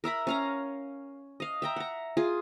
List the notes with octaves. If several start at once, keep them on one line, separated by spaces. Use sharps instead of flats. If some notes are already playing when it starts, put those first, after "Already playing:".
A#4 E5 A#5 B5
C#4 F5 A#5
D#5 F5
E5 G5 A#5
F#5 A#5
F4 G#4